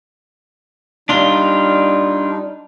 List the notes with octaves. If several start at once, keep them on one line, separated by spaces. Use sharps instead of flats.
G3 D4 D#4 F4